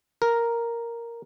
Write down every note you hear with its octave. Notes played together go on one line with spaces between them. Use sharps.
A#4